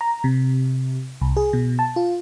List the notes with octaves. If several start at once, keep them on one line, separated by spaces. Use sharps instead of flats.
A#5
C3
C2
G#4
B2
A5
F4